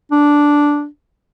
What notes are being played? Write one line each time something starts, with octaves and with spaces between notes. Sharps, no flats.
D4